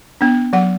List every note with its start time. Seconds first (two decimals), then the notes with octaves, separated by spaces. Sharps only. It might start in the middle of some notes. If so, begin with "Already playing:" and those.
0.21 B3 D4
0.53 F#3 F#5